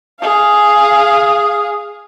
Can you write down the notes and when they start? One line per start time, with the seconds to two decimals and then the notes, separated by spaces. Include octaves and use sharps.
0.21 G#4 F5